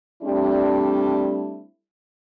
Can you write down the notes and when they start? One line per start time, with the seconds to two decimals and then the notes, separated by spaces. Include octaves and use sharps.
0.23 G3 A3 C4 D4 E4